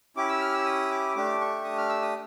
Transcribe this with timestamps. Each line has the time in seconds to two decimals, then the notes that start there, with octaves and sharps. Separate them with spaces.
0.16 C#4 E4 G4 D6
0.29 E6
0.41 F6
0.54 E6
0.66 D#6
0.91 D6
1.15 A3 D4 G4 D6
1.41 C#6
1.64 D#6
1.78 F6
1.89 E6
2.02 D#6